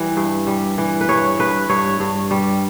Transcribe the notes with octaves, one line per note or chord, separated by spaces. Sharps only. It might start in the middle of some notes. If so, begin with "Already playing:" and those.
Already playing: E3 G3
G2
G3
E3
B4
G2 C#5
G2 B4
G2 C#5
G2
G3